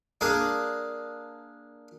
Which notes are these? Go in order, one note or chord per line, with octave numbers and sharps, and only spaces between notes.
A#3 D4 G#4